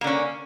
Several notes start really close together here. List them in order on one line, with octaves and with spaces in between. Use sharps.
A#3 D3 C#4